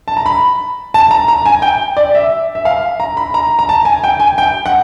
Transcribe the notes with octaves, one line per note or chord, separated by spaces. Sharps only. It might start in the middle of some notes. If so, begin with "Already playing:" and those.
A5
A#5
B5
A5
A#5
A#5
G#5
G5
D5
E5
E5
F5
A#5
B5
A#5
A#5
A5
G#5
G5
G#5
G5
F#5